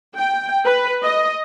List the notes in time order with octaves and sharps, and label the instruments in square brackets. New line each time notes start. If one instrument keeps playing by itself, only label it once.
[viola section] G5
B4
D#5